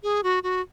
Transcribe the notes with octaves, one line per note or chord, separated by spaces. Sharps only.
G#4
F#4
F#4